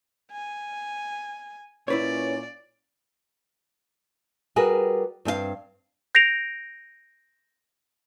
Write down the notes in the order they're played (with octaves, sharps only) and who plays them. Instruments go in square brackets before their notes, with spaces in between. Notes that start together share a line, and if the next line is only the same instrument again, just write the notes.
[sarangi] G#5
[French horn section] A#2 C#4 [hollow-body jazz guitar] E4 B4 C#5 [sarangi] D5
[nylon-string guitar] G3 F#4 G#4 A#4 B4
G2 C4 G#4 F5
[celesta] G6 A#6 C7 D7 F7